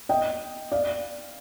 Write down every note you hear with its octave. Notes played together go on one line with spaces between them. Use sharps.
D#5 G5
D5 F5